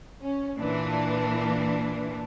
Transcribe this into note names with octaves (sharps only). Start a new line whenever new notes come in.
C#4
A#2 E3 D4